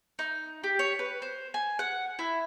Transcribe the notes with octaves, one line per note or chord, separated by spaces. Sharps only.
D#4
G4
C#5
B4
C5
G#5
F#5
E4